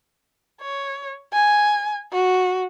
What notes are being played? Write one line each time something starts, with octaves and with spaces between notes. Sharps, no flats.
C#5
G#5
F#4